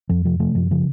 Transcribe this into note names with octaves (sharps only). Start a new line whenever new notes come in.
F2 F3
C3 F3
C3 F3 A3
F#2 F3
C#3 F3